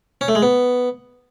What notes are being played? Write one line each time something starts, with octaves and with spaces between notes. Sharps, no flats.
C#4
A3
G#3
B3